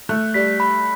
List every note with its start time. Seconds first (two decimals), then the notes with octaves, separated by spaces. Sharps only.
0.09 A3 F#6
0.34 G3 B6
0.60 B5